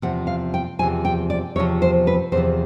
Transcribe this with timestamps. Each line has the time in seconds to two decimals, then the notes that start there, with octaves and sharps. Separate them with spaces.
0.02 E2 C3 F3 F#5
0.27 F5
0.54 G5
0.79 E2 C3 F3 G#5
1.05 G5
1.30 D5
1.56 E2 C3 F3 C#5
1.82 C5
2.07 B4
2.32 E2 C5
2.35 C3 F3